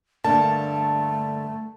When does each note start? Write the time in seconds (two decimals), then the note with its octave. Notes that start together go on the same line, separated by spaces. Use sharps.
0.24 G2 D3 A3 A#3 A5